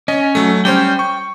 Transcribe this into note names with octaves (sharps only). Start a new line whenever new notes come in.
C#4 D#5
F#3 A3
G3 C#4 C5 G5
C#6